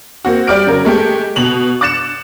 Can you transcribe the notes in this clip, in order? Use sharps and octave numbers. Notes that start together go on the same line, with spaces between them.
A#3 C4 F#4
G3 G4 D5 F6 D7
C#3 F#3 A#4
G#3 A3 G4
B2 F7 F#7
D6 F#6 A6 C#7 E7